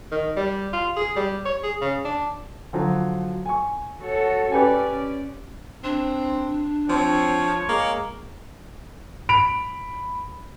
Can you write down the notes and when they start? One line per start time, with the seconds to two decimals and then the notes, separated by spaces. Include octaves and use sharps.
0.12 D#3
0.36 G3
0.73 F4
0.96 G#4
1.16 G3
1.45 C#5
1.63 G#4
1.81 C#3
2.05 D4
2.73 D3 F3 F#3
3.46 G#5 C#6
4.01 F#4 A4 C#5
4.52 C#4 G4 B4 D5 G#5
5.84 C4 D4
6.89 F3 C4 C#5
7.69 G#3 A#3
9.29 B5 D7 F7